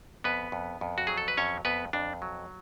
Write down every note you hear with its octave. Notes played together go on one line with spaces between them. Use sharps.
F2 B3 B4
F2
F2
F#4
F#3 G#4
A4
B4
F2 C#4 C#5
F2 B3 B4
F2 D4
F#3